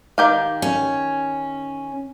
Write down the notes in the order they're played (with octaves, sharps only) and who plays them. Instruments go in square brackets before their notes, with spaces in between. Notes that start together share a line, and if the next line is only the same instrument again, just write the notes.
[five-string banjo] D#3 G4 F5
[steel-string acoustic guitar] C#4